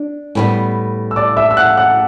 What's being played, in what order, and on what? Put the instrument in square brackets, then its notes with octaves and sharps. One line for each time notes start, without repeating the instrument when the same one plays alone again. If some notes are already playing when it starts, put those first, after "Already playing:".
Already playing: [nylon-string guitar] D4
A2 G3 B3
[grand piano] E6
D5 D6
E5 E6
E6
F#5 F#6
F#5 F#6